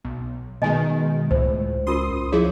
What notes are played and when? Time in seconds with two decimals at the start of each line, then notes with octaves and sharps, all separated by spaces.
0.05 B1
0.62 B2 D#3 G#3 D#5 G#5
1.31 C#2 A2 C5
1.87 C#4 F4 A#4 C6 D#6
2.33 F3 E4 G#4 C#5